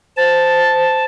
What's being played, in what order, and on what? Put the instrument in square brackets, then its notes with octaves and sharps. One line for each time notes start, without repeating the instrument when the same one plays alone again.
[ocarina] C5 [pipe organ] A5